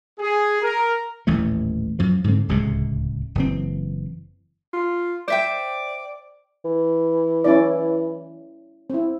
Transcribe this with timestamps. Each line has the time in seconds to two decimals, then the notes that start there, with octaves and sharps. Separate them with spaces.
0.19 G#4
0.62 A#4
1.27 D#1 A1 E3 A3
1.99 F#2 F3
2.24 G#2 D3 C4
2.48 D1 C#2 C3 G#3
3.35 F#1 E3 C4
4.73 F4
5.28 C5 D5 E5 G5
6.65 E3
7.44 C#4 E4 D5
8.90 C4 E4